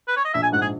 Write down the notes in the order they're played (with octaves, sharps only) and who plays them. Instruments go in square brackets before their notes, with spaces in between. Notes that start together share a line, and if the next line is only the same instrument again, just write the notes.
[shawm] B4
C#5
D#5
[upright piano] A#1 [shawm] E5
[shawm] G#5
[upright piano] G#2 [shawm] F#5
[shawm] G#4